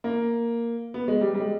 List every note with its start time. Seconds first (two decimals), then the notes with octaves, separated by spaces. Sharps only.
0.04 A#3
0.94 B3
1.08 G#3
1.21 G3
1.34 G3
1.40 G#3